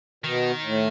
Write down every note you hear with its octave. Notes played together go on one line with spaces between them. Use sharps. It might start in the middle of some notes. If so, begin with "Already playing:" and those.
B2 D#3
A2